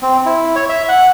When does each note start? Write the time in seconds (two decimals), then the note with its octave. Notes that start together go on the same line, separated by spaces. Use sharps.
0.02 C4
0.26 E4
0.56 C#5
0.69 E5
0.89 F#5